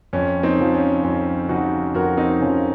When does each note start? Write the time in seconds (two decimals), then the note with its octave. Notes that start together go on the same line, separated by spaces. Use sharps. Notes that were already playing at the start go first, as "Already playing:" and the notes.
0.13 F2 C#4
0.43 C4 D#4
0.58 C#3 F3
0.74 C#4
1.04 F2 C#4
1.49 C#3 F3 D#4 F#4
1.95 F2 F#4 A#4
2.17 C4 D#4
2.41 C#3 F3 C#4